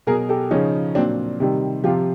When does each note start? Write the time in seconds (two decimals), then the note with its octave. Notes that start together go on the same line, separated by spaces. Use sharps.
0.07 B2 F#3 G#4 A#4
0.29 G4 A4
0.51 C#3 F3 C#4 D#4
0.95 A#2 F#3 C4 D4
1.40 C3 D#3 G3
1.84 C3 F3 F4 G4